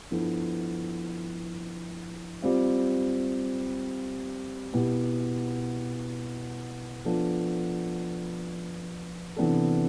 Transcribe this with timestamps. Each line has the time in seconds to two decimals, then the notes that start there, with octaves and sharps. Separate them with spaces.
0.11 G2 F3 B3 E4 A4
2.42 G3 C4 F4
4.74 B2 B3 E4 G4
7.05 F3 B3 D4 F4 A4
9.37 C3 E3 B3 D4 A4